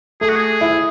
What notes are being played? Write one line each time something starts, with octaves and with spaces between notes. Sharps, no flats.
A3 G#4
F#4
G#4
E4